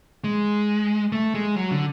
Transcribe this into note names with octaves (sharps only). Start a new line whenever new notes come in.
G#3
A3
G#3
F#3
D3